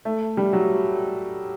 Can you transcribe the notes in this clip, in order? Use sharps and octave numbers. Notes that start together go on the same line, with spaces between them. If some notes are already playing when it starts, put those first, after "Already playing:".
A3
G3
F#3